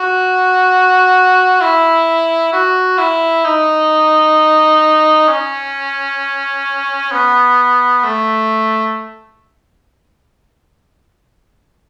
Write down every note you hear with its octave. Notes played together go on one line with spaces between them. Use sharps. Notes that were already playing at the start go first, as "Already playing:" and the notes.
Already playing: F#4
E4
F#4
E4
D#4
C#4
B3
A3